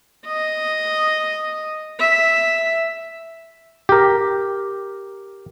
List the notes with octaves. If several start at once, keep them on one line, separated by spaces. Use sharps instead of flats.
D#5
E5
G4 A#4